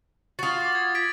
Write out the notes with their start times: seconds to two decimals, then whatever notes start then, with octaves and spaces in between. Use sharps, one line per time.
0.39 F4 F#4 D#6 A6
0.61 D6 A6
0.73 G#6 A6
0.95 G#6 B6 D7